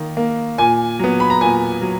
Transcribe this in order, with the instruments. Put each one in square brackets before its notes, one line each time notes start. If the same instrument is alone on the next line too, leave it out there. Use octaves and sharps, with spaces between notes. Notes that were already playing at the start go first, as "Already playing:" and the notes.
Already playing: [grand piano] D#3 A#3
A#3
A#2 G#5
F#3 B3
B5
A#5
A#2 G#5
F#3